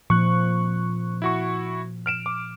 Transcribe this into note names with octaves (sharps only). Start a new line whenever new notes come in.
A#2 F3 C#6 F#6
E4 F#4 C#6
F6 D7 E7
D6